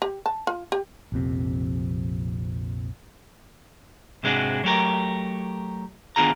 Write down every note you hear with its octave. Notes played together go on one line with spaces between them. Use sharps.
G4
A5
F4
G4
A#1 F2 C3
G#2 C3 G#3 D4 F#4
F#3 A3 G4 A#4
D#3 B3 D4 F4 G#4 A#5